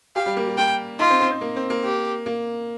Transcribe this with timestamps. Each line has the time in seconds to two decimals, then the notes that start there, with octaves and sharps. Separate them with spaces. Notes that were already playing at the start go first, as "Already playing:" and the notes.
0.16 G4 F5
0.26 G3
0.37 A#3
0.47 G3
0.58 A#3 G5
0.99 D#4 F4
1.10 C4
1.20 C4
1.32 C4
1.41 A#3
1.56 C4
1.70 A#3
1.84 G4
2.26 A#3